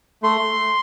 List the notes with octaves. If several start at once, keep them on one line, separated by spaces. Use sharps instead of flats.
A3 C6